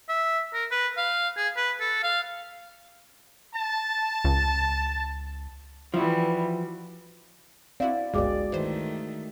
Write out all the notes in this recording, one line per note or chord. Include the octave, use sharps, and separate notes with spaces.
E5
A#4
B4
F5
G#4
B4
A4
F5
A5
C#2
E3 F3 G3 E4 F#4
C4 E4 F#4 D5 F5
G1 C#2 G#3 F#4 G#4 D5 G5 D6
D#3 E3 A3 C5